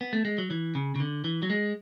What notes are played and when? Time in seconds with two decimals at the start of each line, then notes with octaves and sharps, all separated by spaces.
0.01 B3
0.13 A3
0.25 G#3
0.38 F#3
0.51 E3
0.75 C#3
0.96 C#3
1.00 D3
1.24 E3
1.43 F#3
1.50 G#3